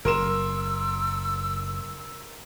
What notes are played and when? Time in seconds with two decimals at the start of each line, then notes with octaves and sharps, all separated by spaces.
0.05 F#1 A#4 C6 E6 E7